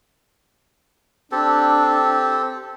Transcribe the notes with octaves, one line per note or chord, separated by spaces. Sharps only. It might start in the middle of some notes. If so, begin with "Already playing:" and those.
C4 D4 G4 A4